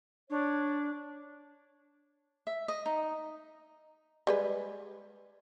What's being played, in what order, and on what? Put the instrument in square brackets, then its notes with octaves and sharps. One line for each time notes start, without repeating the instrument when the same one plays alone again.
[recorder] D4 [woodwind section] C#5
[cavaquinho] E5
D#5
D#4
[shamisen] G3 G#3 B4